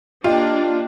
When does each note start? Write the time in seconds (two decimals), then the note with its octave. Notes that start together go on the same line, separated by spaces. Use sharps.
0.24 A#3 D4 F4 G4 D#5